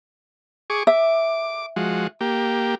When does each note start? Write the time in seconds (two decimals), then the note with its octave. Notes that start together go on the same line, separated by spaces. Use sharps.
0.70 G#4 C#6 D6
0.87 E5 D6
1.76 F3 G#3 F#4
2.21 A#3 G4